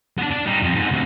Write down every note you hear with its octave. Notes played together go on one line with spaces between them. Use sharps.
B3 D4
D4 D5
G3 D#4
F2
G#2 B3
D2 C3